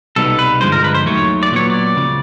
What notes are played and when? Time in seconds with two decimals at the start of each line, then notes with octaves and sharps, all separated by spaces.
0.16 C2 B2 G3 B3 D#4 A4
0.39 B4
0.61 G2 D3 F3 G#3 C5
0.72 A#4
0.84 B4
0.94 C5
1.06 D#2 D#3 F#3 A3 C#5
1.43 D5
1.52 A#2 F#3 B3 C#5
1.70 D5
1.96 C#2 C#3 F3